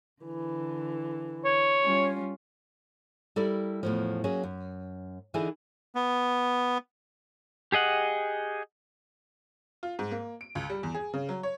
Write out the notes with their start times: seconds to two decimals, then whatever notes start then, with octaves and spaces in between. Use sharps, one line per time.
0.22 D3 E3
1.45 C#5
1.82 G3 C#4 F4
3.36 G3 E4 A4 A#4 D5
3.83 E2 A2 F3
4.24 F#3 A#3 C#4 G#4
4.43 F#2
5.34 D3 E3 D#4 E4 G#4
5.95 B3
7.72 G4 G#4 D#5 F#5
9.83 F4
9.99 G#2
10.11 A#3
10.41 D7
10.55 C#2
10.70 G3
10.83 E2
10.95 G#4
11.14 C#3
11.29 F#3
11.43 C#5